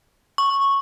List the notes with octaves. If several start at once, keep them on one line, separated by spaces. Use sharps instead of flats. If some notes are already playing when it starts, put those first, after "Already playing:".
C#6